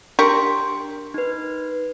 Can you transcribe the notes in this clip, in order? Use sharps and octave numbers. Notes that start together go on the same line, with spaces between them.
D4 G4 A#4 C6 C#6
D#4 B4